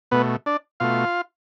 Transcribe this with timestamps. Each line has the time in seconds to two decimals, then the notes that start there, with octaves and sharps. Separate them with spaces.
0.11 B2 A3 B3 B4
0.46 D4 D5
0.80 B2 A3 F4 F5